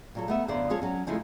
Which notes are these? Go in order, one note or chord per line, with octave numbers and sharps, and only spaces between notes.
A#2 F#3 A4
A3 B3 E5
F#2 D3 B3 F4 C5 D5
F3 G#3 C4 G#4 A4 C#5
F#3 C#4
C#3 F3 G#3 A3 E4 G#4